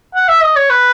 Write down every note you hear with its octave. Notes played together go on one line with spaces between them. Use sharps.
F#5
E5
D#5
C#5
B4